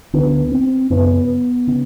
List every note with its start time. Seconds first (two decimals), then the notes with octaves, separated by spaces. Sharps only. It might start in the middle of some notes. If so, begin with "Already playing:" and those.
0.13 D2 D3 B3
0.52 C4
0.90 F#2 C#3 B3
1.67 C#3